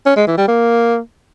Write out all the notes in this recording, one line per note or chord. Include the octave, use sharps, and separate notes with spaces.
C#4
G#3
E3
G3
A#3